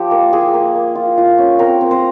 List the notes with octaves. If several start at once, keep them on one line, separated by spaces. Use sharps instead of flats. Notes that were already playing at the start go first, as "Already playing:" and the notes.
Already playing: F3 G4
A#3
F4 G#4
A#3
A#3
F4
F4
C#4
C4 A#4
C4
C5